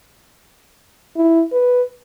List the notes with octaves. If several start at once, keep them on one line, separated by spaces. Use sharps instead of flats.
E4
B4